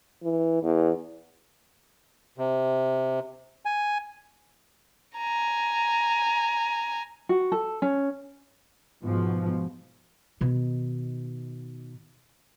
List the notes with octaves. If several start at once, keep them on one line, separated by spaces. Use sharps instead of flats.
E3
E2
C3
G#5
G#5 A#5
F#4
A4
C#4
G#2 B2 F3
B2 D#3